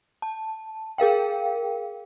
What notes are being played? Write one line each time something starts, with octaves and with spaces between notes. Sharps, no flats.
A5
G#4 A#4 F5 G5